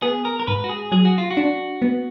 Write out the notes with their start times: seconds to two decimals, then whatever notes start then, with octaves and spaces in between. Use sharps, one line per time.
0.02 B3 G#4
0.25 A#4
0.40 A#4
0.47 G#2 B4
0.64 F#4
0.69 G#4
0.92 F#3 G#4
1.05 F#4
1.18 F4
1.30 F#4
1.37 D4
1.82 B3